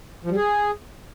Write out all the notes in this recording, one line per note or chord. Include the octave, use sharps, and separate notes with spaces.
F3
G3
G#4